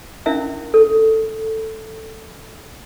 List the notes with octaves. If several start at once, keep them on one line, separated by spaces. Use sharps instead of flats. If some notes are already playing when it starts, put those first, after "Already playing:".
C#4 D4 E4 A#4 E5 F5
A4